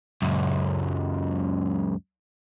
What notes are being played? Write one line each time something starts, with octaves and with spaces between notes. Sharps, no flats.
C#2 F#2